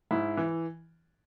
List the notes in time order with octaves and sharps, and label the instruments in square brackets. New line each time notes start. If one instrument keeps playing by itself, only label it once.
[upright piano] G#2 E4
E3